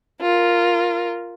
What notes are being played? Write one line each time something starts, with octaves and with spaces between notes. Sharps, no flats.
F4 A#4